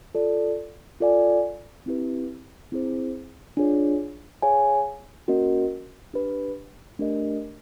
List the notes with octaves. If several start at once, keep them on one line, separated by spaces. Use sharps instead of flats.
F4 A4 D5
F4 A4 D5 F5 G#5
C4 E4 G4 B4
C4 E4 G#4 C5
D4 F4 G#4 C#5
G#4 C#5 F5 G#5
A#3 C#4 F#4 A#4 D#5
D4 G4 B4
A3 D4 G4 A#4 D#5